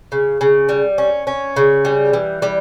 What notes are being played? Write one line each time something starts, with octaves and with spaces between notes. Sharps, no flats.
C#3
C#3
G3
C#4
C#4
C#3
G3
E3
G3